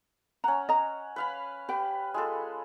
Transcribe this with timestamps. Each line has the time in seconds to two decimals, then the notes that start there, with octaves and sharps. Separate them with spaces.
0.44 C#4 F#5 A#5
0.69 D#5 A#5
1.16 B4 F5 B5
1.69 G4 B4 G5
2.14 G#3 F4 A4